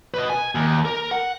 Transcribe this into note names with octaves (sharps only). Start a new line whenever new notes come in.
B4 D#5
G#5
D#2
A#4
F#5